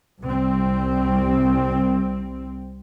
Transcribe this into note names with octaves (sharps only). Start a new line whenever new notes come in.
C2 G3 C4